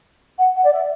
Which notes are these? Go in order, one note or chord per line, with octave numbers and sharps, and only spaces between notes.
F#5
F#5
D5
E5